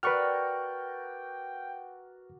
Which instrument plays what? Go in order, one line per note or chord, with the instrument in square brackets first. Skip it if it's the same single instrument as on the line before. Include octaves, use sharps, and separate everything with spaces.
[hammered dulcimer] F#4 A#4 D5 [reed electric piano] B4 C#6 F6 [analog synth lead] G5